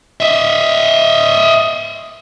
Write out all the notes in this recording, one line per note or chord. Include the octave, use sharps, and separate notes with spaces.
D#5 E5